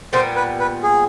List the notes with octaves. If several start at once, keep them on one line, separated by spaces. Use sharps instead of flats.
A#2 G3 B3 C5
B4
B4
G#4